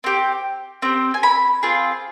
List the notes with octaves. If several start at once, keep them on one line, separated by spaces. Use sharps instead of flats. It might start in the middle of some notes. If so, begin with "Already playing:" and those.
C4 G4
C4 G4
G#5
B5
C4 F4 G#4